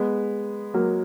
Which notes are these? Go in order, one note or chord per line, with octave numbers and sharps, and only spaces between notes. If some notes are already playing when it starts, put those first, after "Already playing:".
Already playing: G#3 B3
F#3 A#3